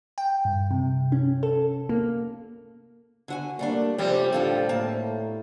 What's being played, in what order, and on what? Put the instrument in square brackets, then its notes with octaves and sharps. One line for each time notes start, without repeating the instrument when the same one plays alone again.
[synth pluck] G5
G2
C3
C#4
A4
A#3
[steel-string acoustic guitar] D3 F#4 G#5
[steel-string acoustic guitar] G3 A3 D4 [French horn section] A#3
[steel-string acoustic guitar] F#2 C3 A3 [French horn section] F3 G4 [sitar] G3 C4
[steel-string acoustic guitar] A2 F4 A4 [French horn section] D3
[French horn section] A2 [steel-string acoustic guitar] A#3 A5